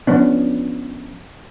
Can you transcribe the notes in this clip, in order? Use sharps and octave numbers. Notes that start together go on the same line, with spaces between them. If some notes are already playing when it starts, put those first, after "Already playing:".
F3 B3 C#4 D4